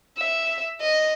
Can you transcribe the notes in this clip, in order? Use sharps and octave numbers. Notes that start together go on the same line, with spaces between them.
E5
D#5